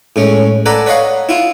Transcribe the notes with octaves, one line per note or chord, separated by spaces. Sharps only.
A2 G#3 C#4
A4 B4 D5 F#5 G#5 A#5
B4 C#5 D#5 F5 F#5
E4 F4